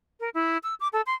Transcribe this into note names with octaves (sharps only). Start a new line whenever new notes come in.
A#4
E4
E6
D6
A4
C6